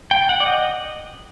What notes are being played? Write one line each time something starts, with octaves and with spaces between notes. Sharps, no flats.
G5
F#5
D5
D#5